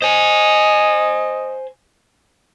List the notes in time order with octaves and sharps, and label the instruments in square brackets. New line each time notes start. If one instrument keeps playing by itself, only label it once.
[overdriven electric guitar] C5 G#5 [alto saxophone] D#5